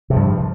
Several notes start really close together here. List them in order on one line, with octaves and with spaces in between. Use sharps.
C3 F3 G2